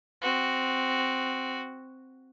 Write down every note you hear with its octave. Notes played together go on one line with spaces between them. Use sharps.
C4 F#4